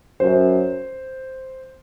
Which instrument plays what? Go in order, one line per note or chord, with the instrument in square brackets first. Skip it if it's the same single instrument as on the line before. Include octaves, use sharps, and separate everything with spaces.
[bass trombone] F#2 [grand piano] C5